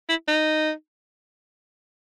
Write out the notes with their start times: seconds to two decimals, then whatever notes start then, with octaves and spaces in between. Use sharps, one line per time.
0.09 E4
0.28 D#4